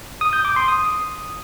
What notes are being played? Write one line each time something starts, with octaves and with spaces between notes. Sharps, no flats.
D#6
G6
D6
C6
D#6